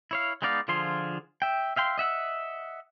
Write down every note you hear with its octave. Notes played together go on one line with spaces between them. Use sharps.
E4 C#5 F5
G#3 B3 D#4 D5 F5
D3 F3 F4 G#4 C6
E5 G5
E5 F5 G5 C6
D#5 E5 F#5 E6